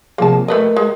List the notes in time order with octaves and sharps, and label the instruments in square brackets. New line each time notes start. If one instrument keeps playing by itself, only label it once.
[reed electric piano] C3 F3 G#4 [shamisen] A#3 A5
[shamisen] A3 B4 D#5 [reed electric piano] A#4
[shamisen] G#3